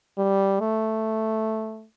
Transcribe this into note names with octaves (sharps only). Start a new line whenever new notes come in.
G3
A3